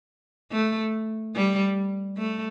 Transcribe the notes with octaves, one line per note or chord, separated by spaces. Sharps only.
A3
G3
A3